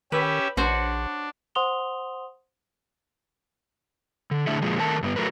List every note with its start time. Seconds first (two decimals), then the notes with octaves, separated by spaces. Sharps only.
0.12 D#3 C#4 G4 B4 E5
0.57 A#1 D4 F#4 C5 C#5
1.55 C5 F#5 C6 D#6 F7 G7
4.31 D3
4.47 D3 A3 D4 E4 G#4 E5
4.62 A#2 F3 G#3
4.79 D#3 A3 A#4 A5
5.03 G2 A#3 B3
5.16 F#3 A3 A#4 B4